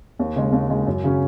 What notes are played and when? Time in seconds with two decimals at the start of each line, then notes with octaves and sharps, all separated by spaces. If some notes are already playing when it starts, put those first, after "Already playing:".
0.19 D#2
0.36 C#3 G#3
0.53 D#2
0.70 C#3 G#3
0.87 F#2
1.04 C#3 F#3 C#4